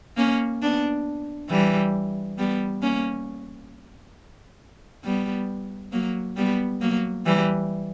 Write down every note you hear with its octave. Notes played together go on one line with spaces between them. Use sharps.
A#3 C#4
B3 D4
E3 G3
G3 B3
A#3 C#4
G3 B3
F#3 A#3
G3 B3
F#3 A#3
E3 G3